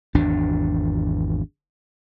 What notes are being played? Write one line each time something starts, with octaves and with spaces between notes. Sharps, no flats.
G#1 E2 D4